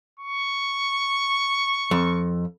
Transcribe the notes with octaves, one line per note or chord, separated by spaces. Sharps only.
C#6
F2